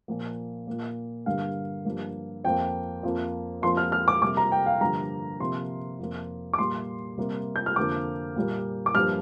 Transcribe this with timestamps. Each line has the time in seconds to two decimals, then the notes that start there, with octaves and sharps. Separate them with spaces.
0.08 A#2 F3 A#3
0.67 A#2 A#3
1.26 G2 D3 G3 A#3 F5
1.85 G2 F3 A#3
2.44 F2 F3 A#3 G5
3.03 F2 F3 A#3
3.62 F2 F3 A#3 C6
3.77 F6
3.92 F6
4.08 D6
4.22 C3 G3 A#3 D6
4.37 A#5
4.52 G5
4.66 F5
4.81 G2 D3 F3 A#3 A#5
5.40 C3 F3 A#3 C6
5.99 F2 F3 A#3
6.53 D6
6.58 A#2 G3 A#3 C6
7.17 C3 G3 A#3
7.56 G6
7.66 F6
7.76 F2 D3 F3 A#3 D6
8.36 A#2 G3 A#3
8.86 D6
8.95 G2 F3 A#3 F6